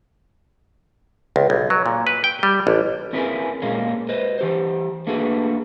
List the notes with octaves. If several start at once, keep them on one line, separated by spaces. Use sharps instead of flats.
C#2
B1
F#3
A#2
B4
G5
G3
A1
C4 C#4 E4 G#4 A#4 B4
A#2 G#3 A#3 C#4
B4 C5 D#5
E3 G4 C5
A3 A#3 D4 F#4 G#4 B4